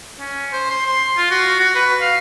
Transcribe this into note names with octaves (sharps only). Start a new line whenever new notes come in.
C#4
C5
C6
C6
F4
F#4
F#4
B4
F5